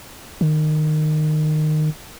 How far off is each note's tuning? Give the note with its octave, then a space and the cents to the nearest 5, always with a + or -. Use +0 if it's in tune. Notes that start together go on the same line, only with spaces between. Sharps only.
D#3 -20